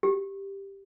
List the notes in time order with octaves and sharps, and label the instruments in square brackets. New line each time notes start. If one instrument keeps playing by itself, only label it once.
[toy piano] G4